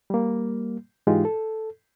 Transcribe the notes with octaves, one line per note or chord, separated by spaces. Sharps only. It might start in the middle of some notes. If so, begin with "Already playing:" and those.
G3 A#3
G#2 E3 G#3 D#4 F4 G4
A4